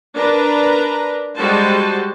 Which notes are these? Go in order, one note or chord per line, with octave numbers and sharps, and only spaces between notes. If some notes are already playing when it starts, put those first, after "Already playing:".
D4 A#4 B4 A#5
G3 G#3 F#4 C5 A5